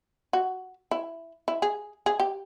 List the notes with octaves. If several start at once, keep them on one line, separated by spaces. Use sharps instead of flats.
F#4
E4
E4
G#4
G#4
G4